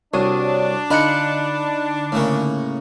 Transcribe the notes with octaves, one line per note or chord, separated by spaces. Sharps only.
C2 D4 F#4 C#5 D5 D#6
D3 D#4 F4 B5 F#6 C#7
A2 C#3 A#3